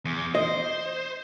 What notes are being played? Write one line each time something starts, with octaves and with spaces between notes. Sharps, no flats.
E2
C5 D#5